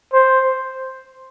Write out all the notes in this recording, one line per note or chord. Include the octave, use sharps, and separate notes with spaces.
C5